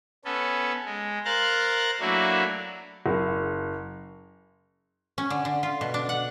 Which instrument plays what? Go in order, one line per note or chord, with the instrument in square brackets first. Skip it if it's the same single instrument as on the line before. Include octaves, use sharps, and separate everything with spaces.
[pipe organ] B3 C#4 A4
G#3
A#4 C5 F5 A#5 F#6 A6
F#3 A3 A#3 D4 E4 F#4
[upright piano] F#1
[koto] C#4
D3
D3
F4
B2
D4
F#5